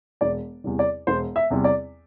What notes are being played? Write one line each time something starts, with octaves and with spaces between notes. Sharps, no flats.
E1 D5
E2 C3 G3
D5
E1 C5
E5
E2 C3 G3
D5